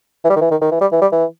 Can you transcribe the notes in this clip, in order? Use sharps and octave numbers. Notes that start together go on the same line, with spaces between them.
E3
G3
D#3
E3
D#3
D#3
E3
G3
E3
G3
E3